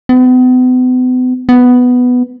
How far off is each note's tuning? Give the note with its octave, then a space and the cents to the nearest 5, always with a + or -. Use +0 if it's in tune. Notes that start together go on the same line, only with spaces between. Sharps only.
B3 +40
B3 +5